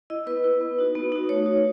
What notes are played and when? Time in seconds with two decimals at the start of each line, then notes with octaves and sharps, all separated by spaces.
0.10 E4 D#5
0.26 B3 B4
0.44 E4
0.61 B3
0.79 D#4 F#4
0.95 B3
1.12 D#4 F#4
1.29 A3 C#5
1.46 D#4 F#4